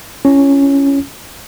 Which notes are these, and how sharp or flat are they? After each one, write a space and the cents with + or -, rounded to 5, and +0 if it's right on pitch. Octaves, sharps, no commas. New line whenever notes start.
C#4 +0 E4 +45